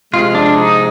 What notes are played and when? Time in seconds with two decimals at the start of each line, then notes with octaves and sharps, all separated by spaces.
0.13 C3 F3 G#3 F4
0.35 D4
0.57 D#4